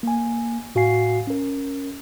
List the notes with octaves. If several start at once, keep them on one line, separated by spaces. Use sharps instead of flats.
A#3 G#5
A2 F#4 F5 G#5 C7
C#4 A#4